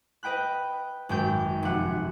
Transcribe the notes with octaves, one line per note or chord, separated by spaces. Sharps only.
B4 D#5 G5 B5 F#6
G#1 F#2 G5 G6
F1 F#5